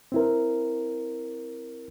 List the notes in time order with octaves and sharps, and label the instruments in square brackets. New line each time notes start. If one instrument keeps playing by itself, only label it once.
[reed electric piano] C4 E4 A#4